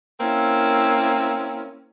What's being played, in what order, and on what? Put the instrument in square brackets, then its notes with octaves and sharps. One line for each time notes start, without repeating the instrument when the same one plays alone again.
[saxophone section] A#3 C4 C#4 E4